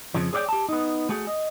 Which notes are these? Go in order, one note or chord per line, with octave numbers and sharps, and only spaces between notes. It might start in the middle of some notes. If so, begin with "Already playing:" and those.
F2 C#3 F3
G#4 C#5 D5 F5 G5
G4 A5
B3 D#4
A3 F#4 G#4
D#5